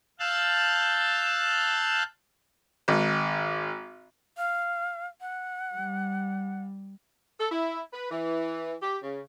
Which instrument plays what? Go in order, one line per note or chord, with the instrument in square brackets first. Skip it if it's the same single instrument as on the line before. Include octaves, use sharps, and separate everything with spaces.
[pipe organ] F5 A5 E6 F#6 G6 A6
[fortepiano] G#1
[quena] F5
F#5
[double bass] G3
[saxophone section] A4
E4
B4
E3
G4
C#3